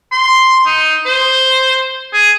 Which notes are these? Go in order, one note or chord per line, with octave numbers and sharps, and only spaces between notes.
C6
D#4
C5
G#4